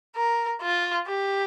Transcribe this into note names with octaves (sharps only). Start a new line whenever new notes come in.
A#4
F4
G4